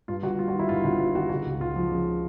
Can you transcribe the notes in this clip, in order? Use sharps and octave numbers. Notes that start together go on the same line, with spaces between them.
G2 F4
G1 F#4
G3 F4
F#4
D#3
E4
G2 F4
G1 F#4
G3 F4
D#3 F#4
C#3 F#4
C#2
C#2 F4
F3
C#3